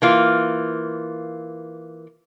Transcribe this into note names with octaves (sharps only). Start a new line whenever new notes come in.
E3 A#3 F4